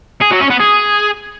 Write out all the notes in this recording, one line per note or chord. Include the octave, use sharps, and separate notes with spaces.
G#4
F#3
C#4
B3
G#4